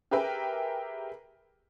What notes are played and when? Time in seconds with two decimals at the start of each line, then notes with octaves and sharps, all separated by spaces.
0.11 G4 G#4 A#4 B4 E5 G5